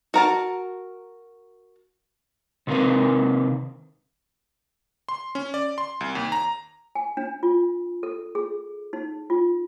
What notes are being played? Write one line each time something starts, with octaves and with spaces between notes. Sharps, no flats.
F#4 A#4 A5
C3 D#3 C4 A#4 B4
C6
C#4
D5
C6
C2
D#2
A#5
G#5
D4
F4
A4
G#4
D#4
F4